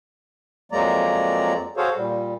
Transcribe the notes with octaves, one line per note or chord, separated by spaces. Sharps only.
F2 F#3 G#3 A#3 D5 A#5
F#4 G#4 A4 C5 C#5 F5
A#2 G3